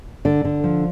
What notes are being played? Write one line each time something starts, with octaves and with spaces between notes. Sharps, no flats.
D3 D5
D3
F3